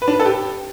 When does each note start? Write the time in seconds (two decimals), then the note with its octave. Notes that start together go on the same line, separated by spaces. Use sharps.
0.02 B4
0.08 D4
0.14 B4
0.20 A4
0.25 G4